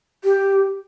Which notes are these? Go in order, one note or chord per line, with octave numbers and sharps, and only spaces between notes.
G4